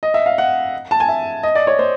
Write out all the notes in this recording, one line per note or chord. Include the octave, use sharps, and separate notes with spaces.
D#5
E5
F5
F#5
A5
G#5
E5
D#5
D5
C#5
C5